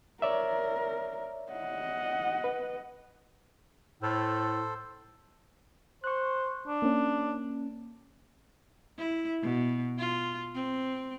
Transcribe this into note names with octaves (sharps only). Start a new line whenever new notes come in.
A#4 C#5 D5 E5
D#5 F#5
B4
A2 A4 C5
C5 C#6 F#6
D4
A#3 C#4
E4
B2
F4
C4